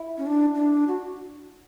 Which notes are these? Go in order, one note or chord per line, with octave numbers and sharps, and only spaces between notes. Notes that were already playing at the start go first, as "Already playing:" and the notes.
Already playing: E4
C#4
D4
D4
F#4